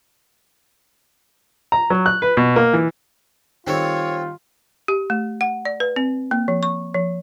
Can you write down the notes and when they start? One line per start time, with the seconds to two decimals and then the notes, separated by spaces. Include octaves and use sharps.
1.72 A#5
1.90 F#3
2.06 F#6
2.22 B4
2.37 B2
2.56 A#3
2.73 E3
3.67 D#3 G3 C4 F4 A4 C#5
4.88 G4
5.10 A3
5.41 F#5
5.65 D5
5.80 B4
5.96 C4
6.31 A#3
6.48 F3
6.63 C#6
6.94 F3